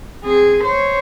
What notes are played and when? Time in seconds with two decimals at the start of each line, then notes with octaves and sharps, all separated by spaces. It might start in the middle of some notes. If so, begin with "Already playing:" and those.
0.25 C4 G#4
0.65 C5 C#5